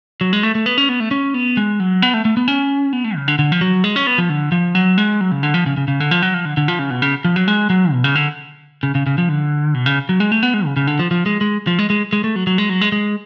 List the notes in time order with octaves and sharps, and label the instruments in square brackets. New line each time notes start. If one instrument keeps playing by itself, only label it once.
[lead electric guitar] F#3
G#3
A3
A3
B3
C#4
B3
A3
C#4
B3
G#3
F#3
B3
A3
A3
B3
C#4
B3
A3
C#3
D3
D3
F3
F#3
G#3
C#4
B3
F3
D3
F3
F#3
G#3
F#3
C#3
D3
F3
C#3
C#3
C#3
D3
F3
F#3
F3
D3
D3
F3
C#3
B2
C#3
F3
F#3
G#3
F#3
B2
C#3
D3
C#3
C#3
C#3
F3
D3
B2
C#3
F#3
G#3
A3
B3
G#3
C#3
C#3
D3
F3
F3
G#3
G#3
F3
G#3
G#3
G#3
A3
F#3
F#3
G#3
F#3
G#3
G#3